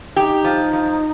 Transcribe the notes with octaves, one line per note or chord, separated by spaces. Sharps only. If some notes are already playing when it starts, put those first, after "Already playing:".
D#4 G4
F3
F3